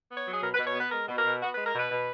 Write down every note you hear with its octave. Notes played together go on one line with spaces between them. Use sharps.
B3
C#5
F#3
G#4
B2 A#4
B4
B2
C#5
B3 B4
G#3 A#4
B2
A#4
B2
B3 F#4
G#3 B4
A#4
B2 B4
B2